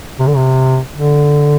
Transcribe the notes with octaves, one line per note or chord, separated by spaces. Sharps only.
C3
D3
C3
D3